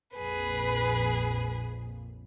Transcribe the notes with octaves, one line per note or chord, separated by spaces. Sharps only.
A#1 F2 A#2 G#4 B4